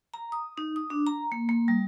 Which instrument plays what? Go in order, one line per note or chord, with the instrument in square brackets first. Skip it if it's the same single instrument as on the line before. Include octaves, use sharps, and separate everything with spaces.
[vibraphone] A#5
D#6
D#4
D#6
D4
A#5
A#3
A#3
G3